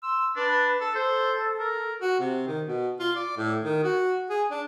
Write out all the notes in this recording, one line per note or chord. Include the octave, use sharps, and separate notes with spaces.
C6 E6
D4 B4
A4
A4 C5
A#4
F#4
C3
D#3
B2
F4
D5
A2
D#3
F#4
G#4
D4